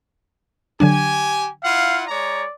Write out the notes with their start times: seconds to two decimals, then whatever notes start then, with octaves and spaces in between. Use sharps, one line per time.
0.80 D3 F#3 D4 G4 G#5
1.64 E4 F4 F5 F#5
2.08 G#3 C#5 D5 A#5